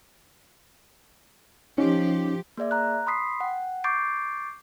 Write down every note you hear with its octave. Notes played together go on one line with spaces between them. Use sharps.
F3 C#4 D#4 G4
A#3 G#4 D5 E5
A#5 F#6
B5 C6 D#6 B6 C7
F#5 G5
C#6 D6 G6 A6 C7 D7